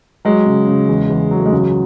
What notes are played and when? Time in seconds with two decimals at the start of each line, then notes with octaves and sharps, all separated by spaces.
0.25 F#3 G#3
0.46 C#3
0.67 C#3
0.89 E2
1.10 E2
1.31 F#3
1.38 A3
1.46 G#3
1.52 C#2 F#3